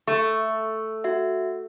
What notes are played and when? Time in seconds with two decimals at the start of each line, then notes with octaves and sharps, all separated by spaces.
0.08 A3 C#6
1.04 F#4 E5